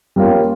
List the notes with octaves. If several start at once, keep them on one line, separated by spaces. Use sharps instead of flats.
G3 A#3 C#4 F4